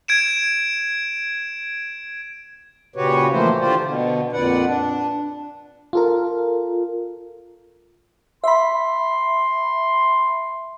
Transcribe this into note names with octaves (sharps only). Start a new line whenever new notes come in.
G#6 D7 E7
A#2 C#3 F#4 G4 B4 C#5
E3 F3 A3 A#3 E4 C5
D3 F4 G4 C5 D5
B2 D3
F2 A#2 B4 D5 F#5
D4
F4 A4 A#4
E5 B5 C6